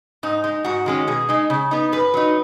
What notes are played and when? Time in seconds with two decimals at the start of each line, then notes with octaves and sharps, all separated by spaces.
0.23 G#2 D#4
0.44 G#3 D#4
0.64 G#2 F#4
0.86 D#3 G#3 C#4
1.07 B2 G#4
1.29 G#3 D#4
1.50 C#3
1.71 B3 D#4
1.92 F#2 B4
2.14 F#3 D#4